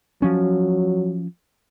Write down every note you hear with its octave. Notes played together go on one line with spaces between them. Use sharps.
F3 F#3 C#4